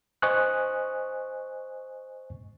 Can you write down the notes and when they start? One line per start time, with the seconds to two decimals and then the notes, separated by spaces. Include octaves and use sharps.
0.22 C5 D#5 G#5 C#6 D#6 F#6